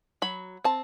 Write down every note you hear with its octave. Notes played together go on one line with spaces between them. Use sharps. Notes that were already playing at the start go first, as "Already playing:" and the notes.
F#3 B5
C4 A5